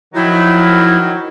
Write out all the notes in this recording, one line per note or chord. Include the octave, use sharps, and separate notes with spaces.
D#3 F3 F#3 E4